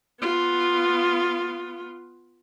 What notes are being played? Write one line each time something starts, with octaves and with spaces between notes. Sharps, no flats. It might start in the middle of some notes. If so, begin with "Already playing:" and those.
B3 F4